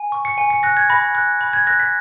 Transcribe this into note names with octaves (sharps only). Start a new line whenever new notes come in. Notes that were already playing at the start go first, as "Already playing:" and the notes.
Already playing: G#5
C#6
C#7
G#5
C#7
F#6 A#6
G#6
B5 A#6
F#6
B5
G#6
F#6 A#6
B6